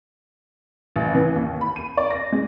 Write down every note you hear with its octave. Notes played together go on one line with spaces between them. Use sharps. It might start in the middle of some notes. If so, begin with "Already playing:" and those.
A1
E3
D#2
B5
D#7
D5
A#6
G#3